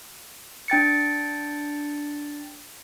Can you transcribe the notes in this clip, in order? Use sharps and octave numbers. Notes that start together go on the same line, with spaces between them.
D4 G5 A6 C#7